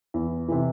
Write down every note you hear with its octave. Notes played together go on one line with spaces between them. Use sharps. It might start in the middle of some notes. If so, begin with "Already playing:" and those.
E2
C3 E3